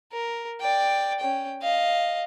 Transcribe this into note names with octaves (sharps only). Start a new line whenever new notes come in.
A#4
D5 G5
C#4 G5
D#5 F5